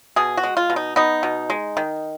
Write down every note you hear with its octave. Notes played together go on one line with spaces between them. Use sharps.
B2 G#4
F#4
G#3
F4
B2
D#4
B3 D#4
B2
G#3
D#3